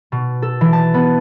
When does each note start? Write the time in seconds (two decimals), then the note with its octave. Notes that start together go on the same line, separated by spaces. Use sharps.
0.12 B2
0.42 A4
0.61 E3
0.73 A5
0.94 B3